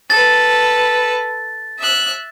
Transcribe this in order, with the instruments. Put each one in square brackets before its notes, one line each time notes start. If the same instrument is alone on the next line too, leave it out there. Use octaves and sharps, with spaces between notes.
[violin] A4 B4 [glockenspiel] A6
[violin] E5 F#6